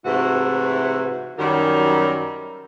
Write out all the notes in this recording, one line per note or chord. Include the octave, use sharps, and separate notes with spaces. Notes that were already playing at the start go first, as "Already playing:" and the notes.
G#2 C3 E3 A3 E4 F#4
F#2 D#3 F#3 G3 D#4 A#4